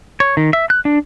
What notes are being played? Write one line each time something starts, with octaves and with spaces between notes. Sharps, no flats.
C#5
D#3
E5
F#6
D4